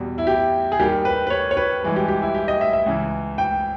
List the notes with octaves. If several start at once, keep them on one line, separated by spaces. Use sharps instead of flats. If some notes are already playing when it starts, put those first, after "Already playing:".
Already playing: E2 B2 G3
E4
G4
G#4
D#2 D#3 G3 G4
B4
B4
C#5
C#5
B4
G2 E3 G#3
G4
G4
E4
G4
D#5
E5
E5
C#2 C#3 E3
G5